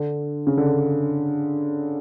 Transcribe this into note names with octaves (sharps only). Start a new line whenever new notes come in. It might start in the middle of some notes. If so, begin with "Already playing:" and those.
Already playing: D3
C#3
D3